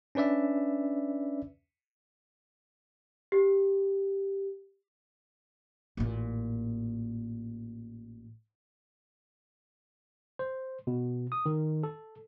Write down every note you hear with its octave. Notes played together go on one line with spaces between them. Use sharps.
C#4 D4 B4 D5 E5
G4
A1 A#2
C5
B2
D#6
D#3
A4